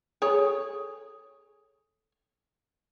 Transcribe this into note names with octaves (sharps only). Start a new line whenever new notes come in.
G#4 A4 C#5